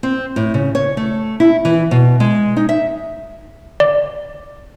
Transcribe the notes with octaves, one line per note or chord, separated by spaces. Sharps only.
C4
A2
C#3
C#5
A3
E4
E3
B2
G#3
D#4
E5
D5